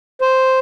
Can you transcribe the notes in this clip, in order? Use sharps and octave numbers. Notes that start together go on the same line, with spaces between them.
C5